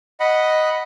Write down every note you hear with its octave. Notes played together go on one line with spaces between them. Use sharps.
D#5 F#5 B5